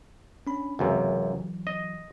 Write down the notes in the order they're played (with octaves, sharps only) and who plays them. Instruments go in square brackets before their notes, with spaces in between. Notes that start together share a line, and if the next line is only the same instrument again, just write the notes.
[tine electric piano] C#4 D4 B5
[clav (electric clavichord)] C#2 F#2 C3 [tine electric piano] E3 F#3
[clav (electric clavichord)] D#5